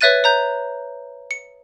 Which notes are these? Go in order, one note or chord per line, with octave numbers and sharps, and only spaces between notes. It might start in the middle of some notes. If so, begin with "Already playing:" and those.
B4 C#5 E5 F#6 A6 D#7
C#5 A#5 G6
C#7